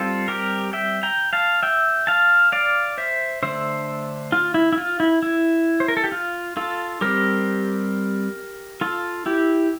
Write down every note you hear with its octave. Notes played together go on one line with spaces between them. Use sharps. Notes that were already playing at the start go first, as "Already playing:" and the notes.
Already playing: G3 C4 F4 A4
G4 A#4
E5 G5
G5 A#5
F5 A5
E5 G5
F5 A5
D5 F5
C5 E5
D3 A3 D4 C5 E5
F4
E4
E4
F4
E4
E4
C5
A#4
A4
G4
F4
F4 A4
G3 C4 G4 A#4
F4 A4
E4 G4